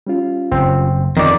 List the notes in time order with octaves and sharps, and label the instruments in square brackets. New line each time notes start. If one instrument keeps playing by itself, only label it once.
[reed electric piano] G3 C#4 F4
[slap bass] F#1 [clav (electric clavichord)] C4
[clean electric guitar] F2 D5 [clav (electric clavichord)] D#3